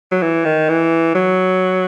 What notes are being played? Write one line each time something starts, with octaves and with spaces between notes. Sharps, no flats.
F#3
E3
D#3
E3
F#3